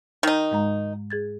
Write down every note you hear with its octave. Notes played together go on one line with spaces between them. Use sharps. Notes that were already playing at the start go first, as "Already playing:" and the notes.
D#3 D#4
G#2 G#3 A#5
G#4 G#6 A6